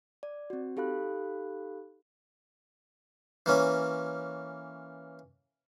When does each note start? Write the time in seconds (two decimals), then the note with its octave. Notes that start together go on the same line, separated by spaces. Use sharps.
0.23 D5
0.50 C4 F#4
0.76 D#4 G4 A4 F5 B5 F#6
3.46 E3 A#3 C#4